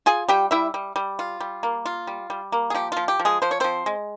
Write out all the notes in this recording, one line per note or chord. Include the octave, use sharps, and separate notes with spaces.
F4 G#4 G#5
G3 G4 G5
G3 E4 E5
G3
G3
F4
G3
A#3
F4
G3
G3
A#3
G#4
F3 G4
F3 F4
G4
F3
G#3 G#4
F3 C5
C#5
F3 C4 C5
G#3